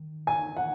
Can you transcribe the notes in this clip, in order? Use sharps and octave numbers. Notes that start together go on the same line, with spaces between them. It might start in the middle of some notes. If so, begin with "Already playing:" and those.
Already playing: D#3
G#5
F#5